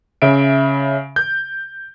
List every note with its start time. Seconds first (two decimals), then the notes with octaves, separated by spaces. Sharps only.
0.22 C#3 E5 D7
1.16 G6